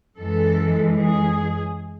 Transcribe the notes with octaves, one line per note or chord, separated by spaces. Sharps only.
F#2 E3 G#3 A4
G#4